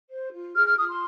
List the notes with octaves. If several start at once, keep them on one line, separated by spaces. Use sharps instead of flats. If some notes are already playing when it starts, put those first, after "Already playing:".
C5
F4
G#4 F6
F6
F4 D#6
C6